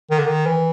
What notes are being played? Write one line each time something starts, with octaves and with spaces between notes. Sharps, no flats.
D#3
D3
D#3
E3